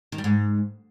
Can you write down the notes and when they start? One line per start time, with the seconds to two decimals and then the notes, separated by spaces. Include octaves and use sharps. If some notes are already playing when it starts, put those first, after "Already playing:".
0.12 D#3
0.18 G3
0.24 G#2